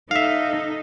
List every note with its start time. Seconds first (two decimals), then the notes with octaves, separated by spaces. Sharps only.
0.11 D#4 A4 E5 F5